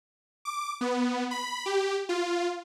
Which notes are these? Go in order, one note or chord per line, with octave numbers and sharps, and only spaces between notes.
D6
B3
B5
G4
F4